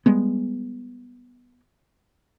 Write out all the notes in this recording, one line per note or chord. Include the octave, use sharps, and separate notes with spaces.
G3 G#3 B3